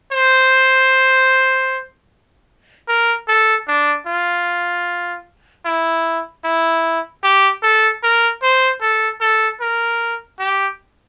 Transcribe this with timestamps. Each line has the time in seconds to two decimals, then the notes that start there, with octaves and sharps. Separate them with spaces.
0.12 C5
2.88 A#4
3.28 A4
3.68 D4
4.07 F4
5.65 E4
6.44 E4
7.23 G4
7.63 A4
8.03 A#4
8.43 C5
8.81 A4
9.21 A4
9.61 A#4
10.40 G4